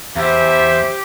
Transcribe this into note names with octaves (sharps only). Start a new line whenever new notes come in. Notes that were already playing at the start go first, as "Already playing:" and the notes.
E2 G4 C5 E5